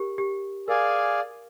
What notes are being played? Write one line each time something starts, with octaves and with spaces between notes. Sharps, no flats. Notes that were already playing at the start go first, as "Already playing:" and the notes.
Already playing: G4 A#4
G4
G#4 A#4 D5 F5 G#5